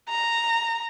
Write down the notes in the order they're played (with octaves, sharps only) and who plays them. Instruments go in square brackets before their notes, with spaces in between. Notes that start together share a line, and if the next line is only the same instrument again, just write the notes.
[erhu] A#5